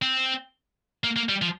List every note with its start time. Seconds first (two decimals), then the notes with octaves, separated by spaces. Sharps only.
0.02 C4
1.04 A#3
1.16 A#3
1.29 G3
1.42 F3